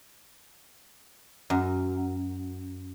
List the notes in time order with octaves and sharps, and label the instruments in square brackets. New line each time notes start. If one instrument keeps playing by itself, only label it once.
[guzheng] F#2